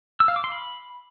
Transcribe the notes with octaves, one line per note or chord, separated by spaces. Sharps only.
E6
F5
D6
C6
B5